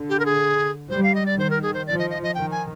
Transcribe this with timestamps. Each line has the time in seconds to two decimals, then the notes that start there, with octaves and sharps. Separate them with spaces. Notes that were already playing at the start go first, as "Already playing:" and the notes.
Already playing: D3
0.09 G4
0.20 A#4
0.25 G#4
0.89 G3 C5
1.03 F5
1.15 D#5
1.26 D5
1.38 D#3 C5
1.50 A#4
1.63 G#4
1.74 C5
1.87 F3 D5
1.99 D#5
2.10 D#5
2.23 D#5
2.35 D#3 G5
2.51 G#5